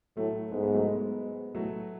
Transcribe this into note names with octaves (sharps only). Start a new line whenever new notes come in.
A2 F#3 A3
G#2 G#3 B3
G#3 B3
F#3 A3
G#3 B3
A2 F#3 A3